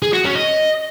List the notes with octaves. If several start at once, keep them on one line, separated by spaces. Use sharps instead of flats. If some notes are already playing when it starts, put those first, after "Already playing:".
G#4
F#4
C#4
D#5